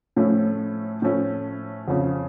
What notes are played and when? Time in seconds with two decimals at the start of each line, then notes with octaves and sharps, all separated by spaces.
0.16 A2 F3 A3 C#4
1.02 A2 F3 A3 C#4
1.88 F2 C#3 F3